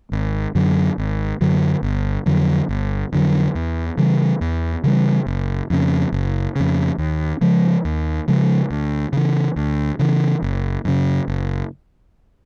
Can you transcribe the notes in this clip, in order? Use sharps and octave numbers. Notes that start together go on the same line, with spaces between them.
G#1
F#2 D3 F#3
G#1
F#2 D3 F#3
G1
F2 D3 F#3
G1
F2 D3 F#3
E2
C#3 E3 G3
E2
C#3 E3 G3
F#1
F2 C#3
F#1
F2 C#3
D#2
C#3 F3 G#3
D#2
C#3 F3 G#3
D2
C#3 E3
D2
C#3 E3
F#1
F#2 C#3
F#1